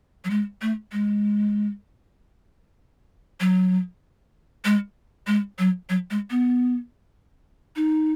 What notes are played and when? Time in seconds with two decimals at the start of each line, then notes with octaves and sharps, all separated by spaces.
0.25 F#3
0.30 G#3
0.62 A3
0.92 G#3
3.40 F#3
4.65 G#3
5.27 G#3
5.59 F#3
5.90 F#3
6.11 G#3
6.31 B3
7.76 D#4